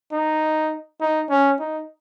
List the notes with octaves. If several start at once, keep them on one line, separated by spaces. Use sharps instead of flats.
D#4
D#4
C#4
D#4